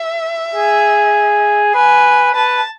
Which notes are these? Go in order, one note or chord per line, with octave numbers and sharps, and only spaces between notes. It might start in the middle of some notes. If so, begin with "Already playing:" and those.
Already playing: E5
G#4
B4 G#5
B4 A5